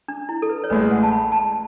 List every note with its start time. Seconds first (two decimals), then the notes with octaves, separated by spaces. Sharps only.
0.08 D4
0.29 E4
0.42 A4
0.49 B4
0.64 C#5
0.70 A1 A2 G#3 B4
0.91 F#5
1.03 A5
1.11 B5
1.32 A5